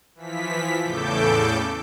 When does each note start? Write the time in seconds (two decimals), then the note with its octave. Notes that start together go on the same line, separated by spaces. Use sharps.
0.15 E3 F3 B6
0.83 E2 A2 C#3 A4 D6 G6